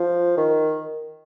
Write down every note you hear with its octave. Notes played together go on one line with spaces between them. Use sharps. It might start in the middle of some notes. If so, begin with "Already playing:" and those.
Already playing: F3
D#3